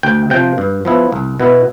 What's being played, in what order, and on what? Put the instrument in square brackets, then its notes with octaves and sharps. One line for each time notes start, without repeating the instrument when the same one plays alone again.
[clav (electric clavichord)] D2 G5
C3 F3 G5
G2
F3 B3 E4
C2
B2 B3 E4